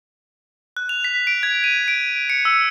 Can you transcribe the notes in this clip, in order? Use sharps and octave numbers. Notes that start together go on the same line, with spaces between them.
F#6
F7
B6
D7
G#6
D#7
D7
C#7
E6